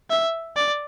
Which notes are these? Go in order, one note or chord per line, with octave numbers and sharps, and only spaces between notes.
E5
D5